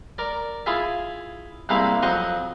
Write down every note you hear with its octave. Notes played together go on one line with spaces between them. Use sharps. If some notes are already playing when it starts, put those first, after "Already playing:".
A#4 D5
E4 F4 G#4 E5
C2 C3 G#3 A#3 E4 F5
F2 F#3 C5 D#5 C#6 D#6